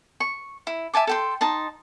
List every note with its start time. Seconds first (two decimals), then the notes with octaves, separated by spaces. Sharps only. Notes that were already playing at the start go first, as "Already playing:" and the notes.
0.20 C#6
0.67 E4
0.94 E5 G#5 A5 D6
1.07 A4 G5 C6
1.41 D#4 A5 C6